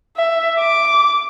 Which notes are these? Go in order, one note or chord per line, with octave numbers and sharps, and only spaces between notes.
E5
D6